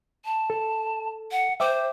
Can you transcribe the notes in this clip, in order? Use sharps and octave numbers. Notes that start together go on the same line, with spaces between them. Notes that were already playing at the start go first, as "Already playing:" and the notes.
A5
A4
F#5
C5 E5 G5 D6